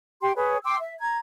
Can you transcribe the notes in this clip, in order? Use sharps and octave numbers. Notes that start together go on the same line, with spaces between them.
G4 G5 C6
G#4 B4 C#5
G5 C6 D6 E6
E5
A#5 G#6